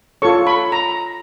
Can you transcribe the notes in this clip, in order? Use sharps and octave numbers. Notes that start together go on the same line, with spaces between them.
F4 A4 C#5 C#6
B5
A#5